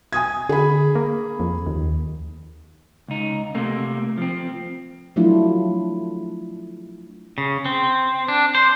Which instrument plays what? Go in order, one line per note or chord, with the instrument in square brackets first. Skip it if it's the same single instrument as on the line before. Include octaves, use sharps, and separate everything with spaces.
[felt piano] G#5 D#6 G#6
[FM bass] D3 [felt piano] G#4 B5
[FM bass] A#3
F2
D#2
[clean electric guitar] C#2 D#4
C3 A3 A#3
F3 C4
[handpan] F3 F#3 A3 D4 E4 F4
[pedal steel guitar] C#3
C4
D4
C5